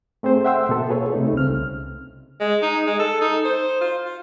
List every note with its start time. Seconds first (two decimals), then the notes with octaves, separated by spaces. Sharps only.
0.23 A3 C4 G#4 C5
0.45 E5 F#5 G5 C6 E6
0.69 B2 A#3 B3 A4
0.89 F4 G#4 B4 C#5
1.12 C3 A3 D#4 A4
1.33 C2 C#3 C4 F6
2.40 G#3
2.62 D#4
2.86 G#3
2.99 A4
3.21 D#4
3.45 C5
3.81 F4
4.04 F4